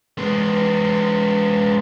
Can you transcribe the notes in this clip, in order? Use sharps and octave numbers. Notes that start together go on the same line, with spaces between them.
G#3 B3